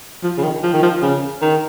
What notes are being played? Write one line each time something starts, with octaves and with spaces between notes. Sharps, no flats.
F3
C#3
D#3
F3
D#3
F3
C#3
D#3